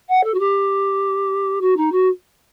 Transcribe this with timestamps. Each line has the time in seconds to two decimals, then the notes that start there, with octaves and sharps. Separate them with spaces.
0.09 F#5
0.24 A4
0.34 F#4
0.39 G4
1.61 F#4
1.77 D#4
1.92 F#4